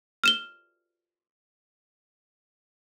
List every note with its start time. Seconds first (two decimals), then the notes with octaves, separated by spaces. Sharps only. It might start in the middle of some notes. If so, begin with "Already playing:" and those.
0.24 F6 E7 G7